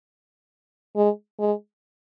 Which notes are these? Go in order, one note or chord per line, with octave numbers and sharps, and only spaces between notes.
G#3
G#3